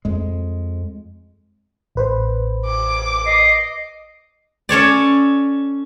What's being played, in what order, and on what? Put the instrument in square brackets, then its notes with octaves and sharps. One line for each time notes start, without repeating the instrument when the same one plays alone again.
[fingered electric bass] F2 G#3
[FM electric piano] A1 B4 C5
[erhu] D6
[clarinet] D#5 [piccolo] C7
[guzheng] C#4 A4 C#5 D5